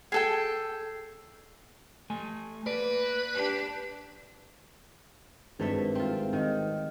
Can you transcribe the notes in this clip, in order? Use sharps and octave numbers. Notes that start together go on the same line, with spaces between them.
G#4 A4 G5
A3 G#5
A#3 B4 D5
D4 G4
G#1 G2 A3 E5
C4 F4
D#3